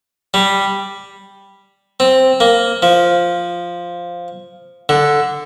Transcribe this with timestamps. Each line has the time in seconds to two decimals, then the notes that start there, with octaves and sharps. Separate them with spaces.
0.34 G3
2.00 C4
2.40 A#3
2.83 F3
4.89 D3